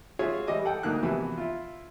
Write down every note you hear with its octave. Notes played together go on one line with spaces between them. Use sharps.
F4 F#4 G#4 C#5 E5
E3 G3 D#5 D6
A4 F#5 G5
D2 A#3 D#4 F#6
A#1 C3 E3 B3 F#4 B5
E4 F4